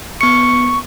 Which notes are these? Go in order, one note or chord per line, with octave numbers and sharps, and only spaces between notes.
B3 C#6 C#7